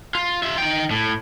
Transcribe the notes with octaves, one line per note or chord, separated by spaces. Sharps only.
F4
F4 E5
D#4 G5
A2